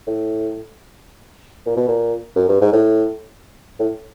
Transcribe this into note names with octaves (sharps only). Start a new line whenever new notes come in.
A2
A#2
B2
A#2
F#2
G2
G#2
A2
A2